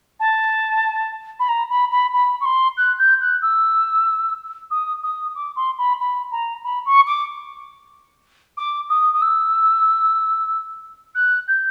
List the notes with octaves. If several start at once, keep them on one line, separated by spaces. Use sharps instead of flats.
A5
B5
A#5
B5
B5
B5
C#6
C6
F#6
G6
F#6
E6
D#6
D#6
D6
C6
B5
B5
A#5
B5
C#6
D6
D6
D#6
D#6
E6
F#6
G6